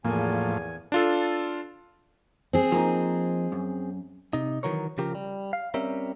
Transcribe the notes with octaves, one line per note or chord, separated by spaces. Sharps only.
E2 A2 F3 A#3 G#5
D4 F4 A4
C4 G#4
F3 A#3 D#4
F#2
C3 D#4
D#3 E3 F#3 A#4 C#5
C#3 F3 G4 A#4
G3
F5
G3 C4 C#4 A#4 E5